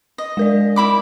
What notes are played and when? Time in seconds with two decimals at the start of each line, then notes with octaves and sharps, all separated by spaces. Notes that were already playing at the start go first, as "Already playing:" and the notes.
0.18 D#5
0.37 G#3 A#4 D5
0.76 E4 B5 D6